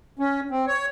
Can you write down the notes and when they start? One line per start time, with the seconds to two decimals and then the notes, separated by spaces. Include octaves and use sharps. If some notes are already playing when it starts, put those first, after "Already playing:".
0.19 C#4
0.51 C4
0.67 C#5